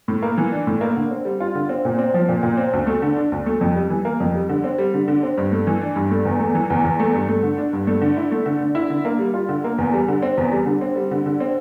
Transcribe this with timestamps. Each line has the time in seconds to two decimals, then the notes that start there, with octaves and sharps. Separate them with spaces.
0.08 A2
0.22 A#3
0.38 E3
0.52 D4
0.67 A2
0.81 A#3
0.96 D3
1.11 C4
1.25 G3
1.40 F4
1.55 D3
1.69 C4
1.85 A#2
1.99 C4
2.14 F3
2.29 A#2
2.43 A#2
2.57 C4
2.73 D2
2.87 A3
3.02 D3
3.17 D4
3.32 D2
3.46 A3
3.61 F2
3.75 G3
3.90 E3
4.05 A#3
4.20 F2
4.35 G3
4.49 D3
4.64 C4
4.78 G3
4.94 D3
5.08 D3
5.23 C4
5.38 G2
5.52 A3
5.67 E3
5.81 D4
5.96 G2
6.11 A3
6.25 E2
6.40 A3
6.55 E3
6.70 E2
6.84 E2
7.00 A3
7.13 G2
7.29 A3
7.43 D3
7.58 D4
7.73 G2
7.87 A3
8.02 D3
8.17 E4
8.32 A3
8.46 D3
8.61 D3
8.75 E4
8.90 D3
9.05 A#3
9.19 G3
9.34 F4
9.49 D3
9.64 A#3
9.78 E2
9.93 G3
10.08 D3
10.22 C4
10.38 E2
10.52 G3
10.66 D3
10.81 C4
10.95 G3
11.11 D3
11.26 D3
11.40 C4